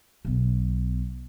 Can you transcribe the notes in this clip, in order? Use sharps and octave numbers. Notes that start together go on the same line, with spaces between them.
B1 B3